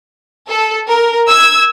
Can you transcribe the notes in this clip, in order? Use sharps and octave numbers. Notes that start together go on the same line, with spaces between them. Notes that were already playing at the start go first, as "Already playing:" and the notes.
A4
A#4
E6 G#6